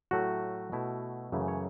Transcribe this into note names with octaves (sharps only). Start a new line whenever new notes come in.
A2 F#3 A3 F#4
B2 A3 E4
F#2 C#3 E3 A3 E4
C#5